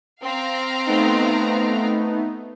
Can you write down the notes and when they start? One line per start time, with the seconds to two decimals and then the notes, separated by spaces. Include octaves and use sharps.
0.23 C4 F5 A#5
0.86 A3 B3 D#4